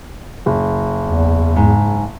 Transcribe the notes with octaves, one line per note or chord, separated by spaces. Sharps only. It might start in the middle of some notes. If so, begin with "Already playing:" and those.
F#1
E2
G#2